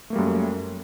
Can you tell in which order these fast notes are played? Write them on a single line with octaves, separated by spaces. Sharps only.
A3 A#3 G3 F#2